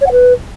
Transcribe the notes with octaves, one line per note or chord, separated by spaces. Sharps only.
C#5
F#5
B4